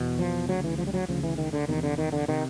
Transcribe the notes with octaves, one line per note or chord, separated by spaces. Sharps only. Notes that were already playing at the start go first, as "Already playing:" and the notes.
Already playing: E2 B2
F3
D2 C#3 F#3
E3
F3
G3
F#3
D2 C#3 F3
E3
D#3
D3
E2 C3 D#3
D3
D#3
D3
C3 D#3